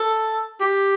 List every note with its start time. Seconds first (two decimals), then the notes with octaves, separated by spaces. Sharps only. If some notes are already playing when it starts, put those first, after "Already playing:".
Already playing: A4
0.61 G4